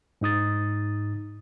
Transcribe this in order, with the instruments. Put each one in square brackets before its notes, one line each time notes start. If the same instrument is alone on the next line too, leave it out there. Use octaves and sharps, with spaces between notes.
[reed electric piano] G#2 D#4 D#6 A6